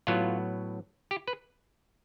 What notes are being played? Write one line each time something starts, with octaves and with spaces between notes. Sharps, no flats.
A2 F#3 B3 F4
G4
B4